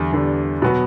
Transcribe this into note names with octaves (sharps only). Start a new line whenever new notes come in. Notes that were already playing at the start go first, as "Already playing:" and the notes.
Already playing: E2 D3 G3
E2 D3 G3
B2 F#3 B3 F#4